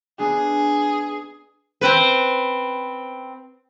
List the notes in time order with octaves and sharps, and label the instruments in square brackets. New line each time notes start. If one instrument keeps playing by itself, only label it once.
[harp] B3 D4 [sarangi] G#4
[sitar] C4 B4